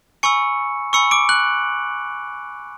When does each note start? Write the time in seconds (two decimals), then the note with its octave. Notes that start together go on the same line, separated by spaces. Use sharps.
0.23 G#5 B5 C#6 E6 C#7
0.93 G#5 B5 C#6 E6 C#7
1.11 D6 D7
1.29 F#6 F#7